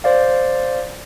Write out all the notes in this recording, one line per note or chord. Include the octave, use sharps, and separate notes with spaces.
C5 D5 F5